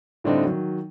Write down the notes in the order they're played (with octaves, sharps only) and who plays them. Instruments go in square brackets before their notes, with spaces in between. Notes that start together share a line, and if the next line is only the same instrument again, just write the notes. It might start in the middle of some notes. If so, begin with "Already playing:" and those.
[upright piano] A2 D3 G3 C4 D4 D#4
D#3 F#3